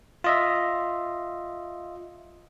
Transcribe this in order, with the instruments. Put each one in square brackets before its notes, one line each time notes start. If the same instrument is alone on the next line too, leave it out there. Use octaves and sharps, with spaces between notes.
[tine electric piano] F4 D#5 E5